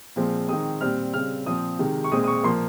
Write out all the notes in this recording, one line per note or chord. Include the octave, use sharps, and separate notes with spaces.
A#2 F3 G#3 C4
D#3 G#3 C4 D#6
A#2 G3 C4 F6
C#3 G3 C4 F6
A#2 F3 C4 D#6
C3 D#3 G#3
C#6
A#2 G#3 C4 D#6
D#6
C#6
A#2 F3 A#3 C6